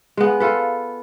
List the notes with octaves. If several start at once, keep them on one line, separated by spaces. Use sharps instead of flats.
G#3 B3
F4 A4 B4